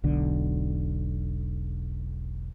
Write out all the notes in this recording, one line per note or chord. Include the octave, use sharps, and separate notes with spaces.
E1 B1 D3